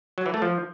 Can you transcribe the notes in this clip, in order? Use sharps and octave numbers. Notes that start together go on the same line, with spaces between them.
F#3
E3
A3
F3